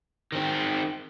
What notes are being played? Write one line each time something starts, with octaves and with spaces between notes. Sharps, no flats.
D#3 C4